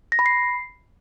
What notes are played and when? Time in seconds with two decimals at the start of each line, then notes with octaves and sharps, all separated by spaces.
0.12 A#6
0.19 B5
0.26 C7